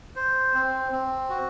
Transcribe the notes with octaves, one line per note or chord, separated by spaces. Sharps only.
C5
C4
C4
F#4